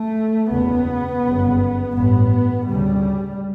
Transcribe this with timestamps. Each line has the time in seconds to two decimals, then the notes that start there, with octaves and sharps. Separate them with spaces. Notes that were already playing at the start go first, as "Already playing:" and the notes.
Already playing: A3
0.52 F#1 E2 C#3 B3
1.25 G1 F#2 C#3
1.95 A1 G2 B3
2.67 D2 C#3 G3